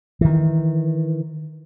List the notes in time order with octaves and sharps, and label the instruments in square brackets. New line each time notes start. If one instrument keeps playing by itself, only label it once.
[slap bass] D#3 E3